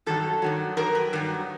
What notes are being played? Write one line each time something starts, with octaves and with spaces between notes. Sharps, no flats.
G2 D#3 F#3 A4
G2 D#3 F#3
G2 D#3 F#3 A#4
B4
G2 D#3 F#3